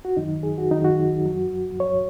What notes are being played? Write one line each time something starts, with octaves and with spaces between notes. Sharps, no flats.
F#4
F#2 D#3 F#3 D#4
G#4
F#4
F#2 D#3 F#3 D#4
F#4
F#2 F#3
F#2 F#3 C#5